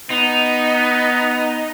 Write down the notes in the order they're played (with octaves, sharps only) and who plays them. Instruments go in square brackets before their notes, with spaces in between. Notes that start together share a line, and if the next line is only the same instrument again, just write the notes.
[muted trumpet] B3 [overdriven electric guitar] D#4